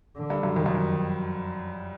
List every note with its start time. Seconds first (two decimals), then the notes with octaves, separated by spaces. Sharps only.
0.17 D3
0.30 G2
0.43 F#2
0.56 F2 D#3
0.66 F#2
0.75 F2